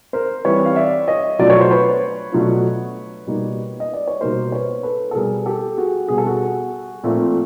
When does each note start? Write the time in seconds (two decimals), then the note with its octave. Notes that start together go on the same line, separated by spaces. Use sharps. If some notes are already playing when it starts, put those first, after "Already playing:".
0.13 A#4 C5
0.45 E3 G3 C4 E4 B4 C#5
0.66 F5
0.76 D5 E5
1.08 C#5 D#5
1.39 B2 F#3 A3 D4 F4 D5
1.50 C#5
1.61 C5
1.71 B4 C#5
2.32 B2 F#3 A3 D4 F4
3.27 B2 G3 A#3 D#4
3.80 D#5
3.94 D5
4.08 C#5
4.21 B2 G3 A#3 D#4 A#4 C5
4.52 B4 C#5
4.83 A4 B4
5.11 A4
5.15 B2 G3 B3 G#4 A#4
5.46 G4 A4
5.78 F#4 G#4
6.08 B2 G3 B3 G#4
6.18 A4
6.26 F#4 G#4
7.04 A#2 F3 A3 C4 F4